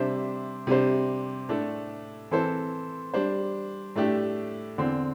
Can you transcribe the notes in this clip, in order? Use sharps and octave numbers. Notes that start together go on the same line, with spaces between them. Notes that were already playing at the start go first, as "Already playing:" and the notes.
Already playing: C3 G3 D4 C5 E5
C3 G3 D4 C5
A2 A3 D4 A4
E3 C4 A4 C5
G3 D4 C5
A2 A3 D4 G4
E2 D3 C4